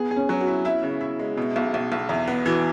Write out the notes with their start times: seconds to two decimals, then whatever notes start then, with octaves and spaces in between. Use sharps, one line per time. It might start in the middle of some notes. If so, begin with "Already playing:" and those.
Already playing: B3 G#4
0.11 G#4
0.16 C#4
0.29 F#3
0.41 F#4
0.47 E4
0.65 E4 E5
0.83 C#3
1.01 E4
1.19 G#3
1.37 B2
1.56 B1
1.74 B1
1.92 B1
2.09 E2 E5
2.28 B3
2.46 E3 F#4